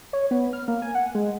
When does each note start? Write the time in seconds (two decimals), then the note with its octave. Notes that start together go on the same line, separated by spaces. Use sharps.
0.13 C#5
0.31 B3
0.53 F6
0.68 A#3
0.82 G#5
0.95 F#5
1.15 G#3